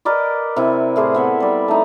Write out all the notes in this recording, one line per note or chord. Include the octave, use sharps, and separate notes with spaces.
A#4 B4 D5 D#5
C3 E4
A2 G#4 C5 D6
B3 E5 F#5
G3 D5
A3 D#4